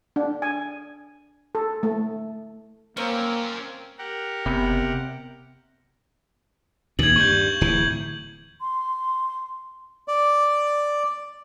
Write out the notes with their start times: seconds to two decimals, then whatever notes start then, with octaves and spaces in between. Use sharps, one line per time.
0.16 D4
0.42 G#5
1.55 A4
1.83 A3
2.97 A#3 C4 C#4 A#4
3.98 G4 A#4 F#5
4.46 F#1 C3 B3
6.99 D#2 A#2 G#6 F#7
7.16 G2 C#6 G6
7.61 D1 E3
8.61 C6
10.08 D5